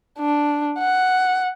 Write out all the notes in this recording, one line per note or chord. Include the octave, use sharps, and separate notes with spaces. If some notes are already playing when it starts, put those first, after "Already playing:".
D4
F#5